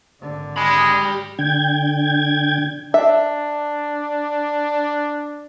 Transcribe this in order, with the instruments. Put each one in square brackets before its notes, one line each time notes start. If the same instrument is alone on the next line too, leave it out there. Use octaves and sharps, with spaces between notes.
[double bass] G#1 D3
[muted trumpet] G#3 [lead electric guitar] G4 B5
[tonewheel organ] D3 G5 G#6
[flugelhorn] D4 [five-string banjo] E5